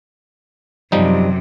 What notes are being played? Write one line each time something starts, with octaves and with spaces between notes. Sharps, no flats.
F#2 C3 F3 G3 D#4